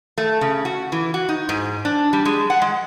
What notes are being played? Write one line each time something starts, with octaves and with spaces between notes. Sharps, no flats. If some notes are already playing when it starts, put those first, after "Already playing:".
A3
C#3
F#4
E3
F#4
D#4
G#2
D4
G3
G#3
F#5
G#3